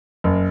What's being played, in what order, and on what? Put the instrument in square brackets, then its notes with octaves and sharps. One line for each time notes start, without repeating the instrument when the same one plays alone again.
[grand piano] F#1